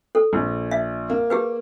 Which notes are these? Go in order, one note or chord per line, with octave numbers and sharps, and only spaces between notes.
A4
A#1
E5
A#3
G4 G#4 B4